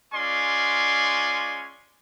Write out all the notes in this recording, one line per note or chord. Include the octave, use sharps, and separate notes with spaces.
G#3 C#4 F4 D5 G#5 C6